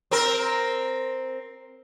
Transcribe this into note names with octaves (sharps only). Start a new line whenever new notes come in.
C4 A#4